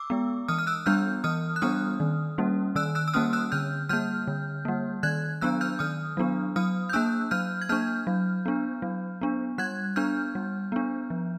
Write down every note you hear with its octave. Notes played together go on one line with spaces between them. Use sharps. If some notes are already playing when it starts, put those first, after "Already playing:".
Already playing: D6 E6
G#3 B3
E3 D#6 F6
F6
E6 F#6
G3 B3 D4 F6 G6
E3 D#6 F6
F#6
G3 B3 D4 D#6 F6
D#3
G3 A#3 C#4
D#3 E6 F#6
E6 F#6
E6
G3 A#3 C#4 D#6 F6
E6 F#6
D3 F6 G6
G3 A#3 F6 G6
D3
G3 A#3
D#3 F#6 G#6
F#3 B3 D4 E6 F#6
F6 G6
D#3 D#6 F6
F#3 B3 D4
F#3 D#6 F6
G6
A#3 D4 E6 F#6
F#3 F6 G6
G#6
A#3 D4 F6 G6
F#3
B3 D4
F#3
B3 D4
G3 F#6 G#6
B3 D4 F6 G6
G3
B3 D4
F3